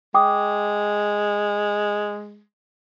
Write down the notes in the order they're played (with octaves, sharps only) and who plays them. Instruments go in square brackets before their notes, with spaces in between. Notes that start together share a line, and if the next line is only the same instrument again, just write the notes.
[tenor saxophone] G#3 [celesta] G5 D6 D#6